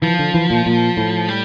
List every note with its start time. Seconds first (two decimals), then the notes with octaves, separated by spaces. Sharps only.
0.02 E3 F3
0.19 D3
0.34 E3
0.50 A#2
0.66 A#2
0.97 A2
1.29 G3